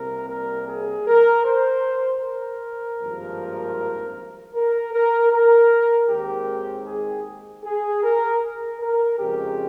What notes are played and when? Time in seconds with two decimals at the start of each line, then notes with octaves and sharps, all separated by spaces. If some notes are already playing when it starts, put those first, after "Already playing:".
Already playing: C2 C3 G3 A#3 A#4
0.29 A#4
0.68 G#4
1.07 A#4
1.45 C5
2.23 A#4
3.00 G#1 G2 F3 A#3
4.55 A#4
4.94 A#4
5.32 A#4
6.09 D#2 D#3 G#3 C4 G4
6.87 G#4
7.65 G#4
8.03 A#4
8.80 A#4
9.19 F2 C#3 G#3 C4 G4